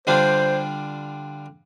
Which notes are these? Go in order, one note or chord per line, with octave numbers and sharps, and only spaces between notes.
D3 G3 D4 F4 C5